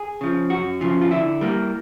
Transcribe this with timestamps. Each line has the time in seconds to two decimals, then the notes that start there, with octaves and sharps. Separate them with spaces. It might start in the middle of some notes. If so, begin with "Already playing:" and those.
Already playing: G#4
0.21 C#3 F3
0.50 F#2 F#4
0.81 C#3 F3
1.01 F4
1.11 D3 E4
1.41 G3 A#3